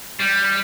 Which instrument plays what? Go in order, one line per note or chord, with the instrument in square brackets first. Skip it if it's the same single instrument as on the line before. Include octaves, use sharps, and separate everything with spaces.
[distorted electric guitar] G3